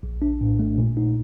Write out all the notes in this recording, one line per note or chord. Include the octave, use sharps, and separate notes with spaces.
A#1
D4
A2
A3
A#2
D#4